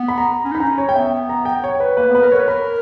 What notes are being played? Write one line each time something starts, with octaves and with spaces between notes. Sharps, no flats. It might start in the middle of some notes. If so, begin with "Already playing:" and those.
Already playing: B3
B5
A#5
C#4
D#4
B5
C#4 A#5
C#5
G5
B3 E5
A#5
G5
C#5
B4
A#3 B4
B3
B4
A#4
B4 C#5
A#4 B5